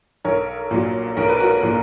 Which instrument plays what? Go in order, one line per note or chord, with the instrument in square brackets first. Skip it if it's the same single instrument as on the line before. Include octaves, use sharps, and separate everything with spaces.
[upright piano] B1 A#4 C#5
A#2 F#3
B1 A#4
B4
F#4 A#4
A#2 F#3